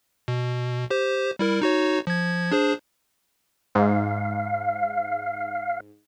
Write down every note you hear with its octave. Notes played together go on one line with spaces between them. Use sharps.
B2
G4 C5
G3 E4 A#4
D#4 F#4 C#5
F3 G#6
D4 G#4 C5
G#2 F5